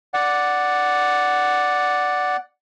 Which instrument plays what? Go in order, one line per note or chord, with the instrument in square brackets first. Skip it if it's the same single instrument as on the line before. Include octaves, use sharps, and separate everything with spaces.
[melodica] D5 F#5